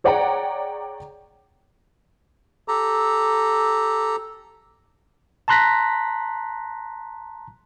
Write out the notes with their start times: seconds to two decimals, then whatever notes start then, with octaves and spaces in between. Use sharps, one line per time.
0.04 G#4 C#5 D5 F#5 G5 A#5
2.68 G4 A4 A#5
5.48 A5 A#5 C6 F#6 A#6 B6